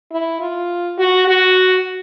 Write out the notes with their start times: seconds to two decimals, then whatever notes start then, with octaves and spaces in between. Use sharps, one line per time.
0.12 E4
0.41 F4
0.98 F#4
1.28 F#4